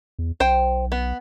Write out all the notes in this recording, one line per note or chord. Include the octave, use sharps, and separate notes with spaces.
E2
B1 C5 G5
B3